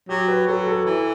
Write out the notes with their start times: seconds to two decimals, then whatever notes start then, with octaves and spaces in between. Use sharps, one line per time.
0.09 F#3 G4
0.28 B4
0.47 F#3 A4
0.67 A4
0.86 E3